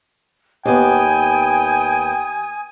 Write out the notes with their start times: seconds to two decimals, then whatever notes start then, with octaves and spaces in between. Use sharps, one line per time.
0.66 D#2 B3 G5 G#5 D#6 G#6